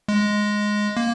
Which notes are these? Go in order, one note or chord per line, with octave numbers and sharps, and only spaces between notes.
G#3
A#3